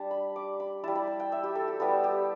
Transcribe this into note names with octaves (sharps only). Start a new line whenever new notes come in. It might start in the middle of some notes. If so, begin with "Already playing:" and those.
Already playing: G3 D4 A5
B5
D6
B5
G3 E4 A5
B5
A5
G5
E5
G4
A4
G4
G3 B3 E4 A4
G4